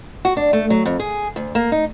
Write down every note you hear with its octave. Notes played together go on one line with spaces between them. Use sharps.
F#4
D4
A3
F#3
F2
G#4
D2
A#3
D#4